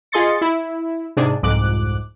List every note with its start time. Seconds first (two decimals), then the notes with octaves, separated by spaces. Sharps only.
0.12 F4 G#4 D#5 C6 A6 C#7
0.41 E4
1.17 G#2 C3 D4 G#4
1.43 C2 F2 G#2 D6 F#6